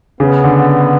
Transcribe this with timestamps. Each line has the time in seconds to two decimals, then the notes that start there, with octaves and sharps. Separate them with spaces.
0.20 C#3 B3
0.44 D3